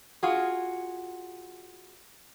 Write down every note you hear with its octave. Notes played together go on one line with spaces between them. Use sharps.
F4 F#4 G#4